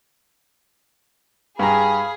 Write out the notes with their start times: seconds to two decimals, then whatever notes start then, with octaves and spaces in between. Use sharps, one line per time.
1.59 G2 G#4 F5 G#5 A#5 B5